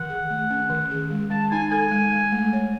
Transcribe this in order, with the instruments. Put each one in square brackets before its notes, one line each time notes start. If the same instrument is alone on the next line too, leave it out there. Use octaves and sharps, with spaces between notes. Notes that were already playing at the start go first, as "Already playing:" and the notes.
Already playing: [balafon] D#3 [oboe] F#5
[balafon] G#4
A3
C#4
D#3
G#4
G#3
[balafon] G#3 [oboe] A5
[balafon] D#4 [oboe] G#5
[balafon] A4 [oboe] G#5
[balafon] G#3
G#3
A3
C#5